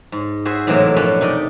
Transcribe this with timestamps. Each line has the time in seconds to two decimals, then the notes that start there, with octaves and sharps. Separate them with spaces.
0.12 G#2
0.45 F#4 G#4 C5 E5
0.67 A2 C3 E3 F#3 G#3 A#3
0.96 F#2 B2 F3 C#4 D4 B4
1.21 C3 D#4 D5 D#5